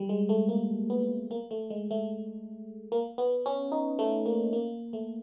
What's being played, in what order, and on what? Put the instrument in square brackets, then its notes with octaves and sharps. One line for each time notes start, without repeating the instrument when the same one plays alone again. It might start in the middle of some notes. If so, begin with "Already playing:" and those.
Already playing: [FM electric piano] G3
G#3
A3
A#3
B3
A#3
A3
G#3
A3
A#3
B3
C#4
D#4
A3
A#3
A#3
A3